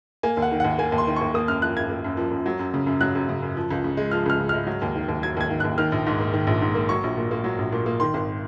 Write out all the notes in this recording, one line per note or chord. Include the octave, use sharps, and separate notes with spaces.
A#3 G#5
D#2
F#5
D#3
D#2 F#5
A#3 G#5
D#2
C6
D#3
D#2 C#6
A#3 D#6
F#2 F6
F3 F#6
F#2 G#6
A#3
F#2
F3
F#2
F#3
F#2
C#3
F#2
F#3 F#6
F#2
C#3
F#2
F3
C#2
C#3
G#3
F3 F6
C#2 F6
C#3
G#3 F6
F#3
D#2
D#3
D#2
F#3 G#6
D#2 G#6
D#3
D#2 F#6
D#3 F6
A#1
G#2
A#3
D#3
A#1
G#2
A#3
F#3 C#6
A#1
A#2
A#3
F#3
A#1
A#2
A#3
D#3 C6
G#1